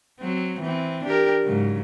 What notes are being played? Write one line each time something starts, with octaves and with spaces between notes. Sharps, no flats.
F#3 C4
E3 C4
D4 G4 A#4
G#2 C#3 F#3